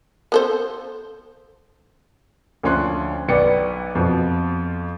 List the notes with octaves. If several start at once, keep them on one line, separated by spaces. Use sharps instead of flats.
B3 A4 C5
D2 F3 C#4 C6 F#6
B1 B3 D5 G5 C#7
F2 B2 F3